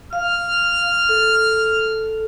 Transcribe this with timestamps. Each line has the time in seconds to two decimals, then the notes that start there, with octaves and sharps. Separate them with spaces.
0.13 F5 F6
1.09 A4